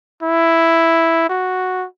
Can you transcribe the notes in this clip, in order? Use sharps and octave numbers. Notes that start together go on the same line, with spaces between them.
E4
F#4